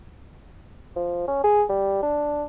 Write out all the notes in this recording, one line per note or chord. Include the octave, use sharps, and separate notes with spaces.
F3
C#4
G#4
G3
D4